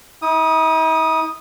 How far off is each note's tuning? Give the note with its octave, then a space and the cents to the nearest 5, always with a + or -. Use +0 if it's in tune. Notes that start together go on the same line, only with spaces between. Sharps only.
E4 -45 D#6 +0